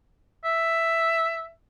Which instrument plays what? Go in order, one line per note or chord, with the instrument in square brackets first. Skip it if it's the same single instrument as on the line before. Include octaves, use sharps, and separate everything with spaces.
[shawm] E5